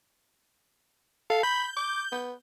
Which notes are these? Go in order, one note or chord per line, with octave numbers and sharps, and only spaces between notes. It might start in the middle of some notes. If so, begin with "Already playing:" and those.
A4 F5
B5 G6
D6
B3